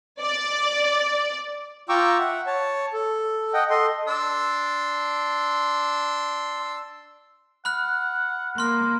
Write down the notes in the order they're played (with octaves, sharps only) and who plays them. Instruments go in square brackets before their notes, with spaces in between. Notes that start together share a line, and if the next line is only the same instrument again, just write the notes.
[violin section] D5
[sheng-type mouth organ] F4 G5 A#5 C#6 D6 E6
E5 F#5
C#5 A5
A4
D#5 F#5 G5
A4 D#5 C6
[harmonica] D4 C6 E6
[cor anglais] F#5 [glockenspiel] B5 F6 F#6
[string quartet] A#3 [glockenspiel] C6 F6